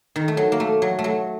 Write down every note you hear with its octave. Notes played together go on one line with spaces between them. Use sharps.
D#3
A3
F#3
A#3
A3
F#3
A3
F#3